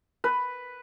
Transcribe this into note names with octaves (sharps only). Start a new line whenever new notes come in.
B4